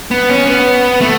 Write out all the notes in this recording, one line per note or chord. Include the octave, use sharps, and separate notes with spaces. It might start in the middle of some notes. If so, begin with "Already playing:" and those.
B3
C#4
B3
A3